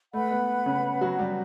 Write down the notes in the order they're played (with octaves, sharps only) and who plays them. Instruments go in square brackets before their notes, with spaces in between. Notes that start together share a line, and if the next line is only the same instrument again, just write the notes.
[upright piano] A3 [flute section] B4 F#5 B5
[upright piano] B3
C#3 C#4
F#3 F#4
G3 G4